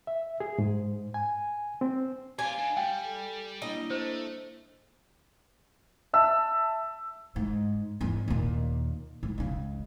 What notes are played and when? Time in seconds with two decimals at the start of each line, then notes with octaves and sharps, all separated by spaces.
0.07 E5
0.40 G#4
0.58 G#2
1.14 G#5
1.81 C4
2.39 F4 G4 F5 G#5
2.58 D4 D#4
2.77 G3 G5
3.04 A4
3.62 A#3 D4 E4 D#5
3.90 A3 C5
6.13 E5 A5 E6
7.36 G#2
8.01 E2 G#2
8.28 D#2 A#2
9.23 G#2
9.38 C#2 C#3